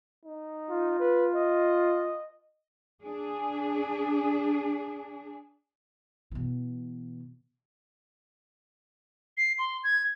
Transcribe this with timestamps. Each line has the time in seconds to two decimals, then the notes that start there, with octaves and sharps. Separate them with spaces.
0.25 D#4
0.71 F4
1.00 B4
1.35 D#5
3.02 D4 G#4
6.31 B2 E3
9.37 C7
9.59 C6
9.84 G#6